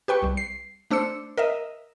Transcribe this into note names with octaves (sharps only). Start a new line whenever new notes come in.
G4 B4 G5 C#6
C2 G3
C7
A3 D4 C5 E6 C#7
A#4 D#5 E5